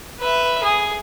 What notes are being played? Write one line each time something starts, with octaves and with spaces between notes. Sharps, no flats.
B4 E5
G#4